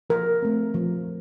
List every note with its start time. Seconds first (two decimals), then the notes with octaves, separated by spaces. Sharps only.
0.10 F3 A#4
0.42 A3 C4
0.74 F3